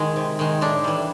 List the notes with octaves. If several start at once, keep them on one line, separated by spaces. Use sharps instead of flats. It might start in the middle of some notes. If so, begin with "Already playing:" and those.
Already playing: D#3 G#3
C3
D#3 G#3
A2 D4
E3 G3